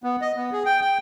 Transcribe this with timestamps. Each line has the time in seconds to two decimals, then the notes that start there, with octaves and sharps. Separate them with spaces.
0.04 B3
0.22 D#5
0.36 B3
0.52 G#4
0.65 G5
0.82 G5